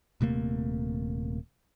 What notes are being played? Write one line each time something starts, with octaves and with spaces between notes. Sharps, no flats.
D#1 C3 A3 A#3